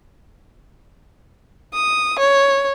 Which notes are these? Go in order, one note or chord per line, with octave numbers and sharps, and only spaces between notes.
D#6
C#5